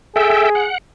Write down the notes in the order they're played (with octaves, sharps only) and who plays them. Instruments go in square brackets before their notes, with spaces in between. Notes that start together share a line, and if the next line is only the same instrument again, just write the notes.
[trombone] G#4 [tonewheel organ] A4 E5 G5
[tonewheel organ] F#5